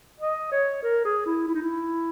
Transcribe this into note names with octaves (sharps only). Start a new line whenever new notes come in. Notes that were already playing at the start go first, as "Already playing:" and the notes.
D#5
C#5
A#4
G#4
E4
E4
D#4
E4